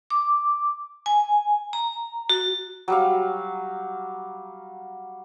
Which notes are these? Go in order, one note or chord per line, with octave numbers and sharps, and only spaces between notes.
D6
G#5
A#5
F#4
F#3 G3 F5